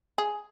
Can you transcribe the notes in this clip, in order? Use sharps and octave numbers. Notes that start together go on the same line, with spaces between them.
G#4